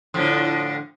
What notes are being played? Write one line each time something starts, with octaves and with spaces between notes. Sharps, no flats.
A2 D3 F3